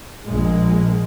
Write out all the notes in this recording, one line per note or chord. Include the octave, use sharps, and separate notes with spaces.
A#1 G#3